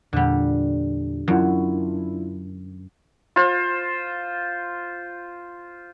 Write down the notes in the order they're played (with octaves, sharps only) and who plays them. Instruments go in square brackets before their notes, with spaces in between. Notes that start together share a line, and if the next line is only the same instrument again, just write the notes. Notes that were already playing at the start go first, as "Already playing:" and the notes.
[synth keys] E2 A#2 [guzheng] D3 G3
[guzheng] F#2 [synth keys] D4 E4 F4
[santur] F4 C5